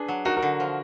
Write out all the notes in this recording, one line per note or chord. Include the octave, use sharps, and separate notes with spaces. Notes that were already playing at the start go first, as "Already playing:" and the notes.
Already playing: D4 G#4 B4
F#3
D#4 F#4 A#4
F#4 A#4
D3
F3